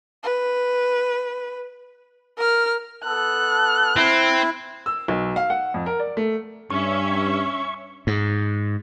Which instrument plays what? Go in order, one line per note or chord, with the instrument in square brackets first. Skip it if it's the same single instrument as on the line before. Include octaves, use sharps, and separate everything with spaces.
[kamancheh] B4
A#4 F6
[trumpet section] B3 A4 [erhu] F#6
[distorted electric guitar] C4 [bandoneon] E4
[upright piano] E6
B1
F5
F#5
F2
A#4
D5
A3
[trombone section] G2 [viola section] C#4 E5 [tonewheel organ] C#6
[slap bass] G#2